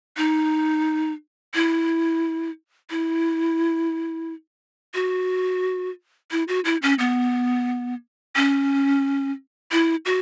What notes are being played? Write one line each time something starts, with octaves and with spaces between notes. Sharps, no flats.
D#4
E4
E4
F#4
E4
F#4
E4
C#4
B3
C#4
E4
F#4